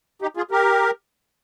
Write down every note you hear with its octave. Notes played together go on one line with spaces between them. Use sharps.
D#4 G4
F4 G#4
G4 A#4